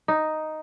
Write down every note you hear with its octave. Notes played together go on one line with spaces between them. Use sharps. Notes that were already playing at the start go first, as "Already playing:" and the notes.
D#4